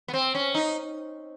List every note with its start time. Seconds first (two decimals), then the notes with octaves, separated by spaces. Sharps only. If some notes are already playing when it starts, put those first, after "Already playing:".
0.08 B3
0.14 C4
0.35 C#4
0.55 D#4